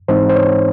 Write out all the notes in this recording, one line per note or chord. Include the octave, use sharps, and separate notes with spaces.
G#2 E3 G#3 C4 D#4 C5
C5
C#5